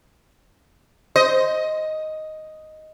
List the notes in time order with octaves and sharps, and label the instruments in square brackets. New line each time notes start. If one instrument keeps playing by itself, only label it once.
[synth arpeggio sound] C5 [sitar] D#5